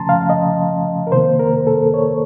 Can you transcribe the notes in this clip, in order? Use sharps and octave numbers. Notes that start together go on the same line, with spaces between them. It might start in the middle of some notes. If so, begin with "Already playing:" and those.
Already playing: C#3 F3 A3 C#4 A5 A#5 C6
F5
D#5
A#4
C3 D#3 A#3 C5
A#4
A4
C#5